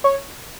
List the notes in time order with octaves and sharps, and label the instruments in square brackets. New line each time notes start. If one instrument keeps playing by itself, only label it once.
[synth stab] C#5